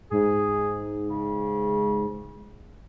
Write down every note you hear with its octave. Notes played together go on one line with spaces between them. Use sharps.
G#2 G#4
C#3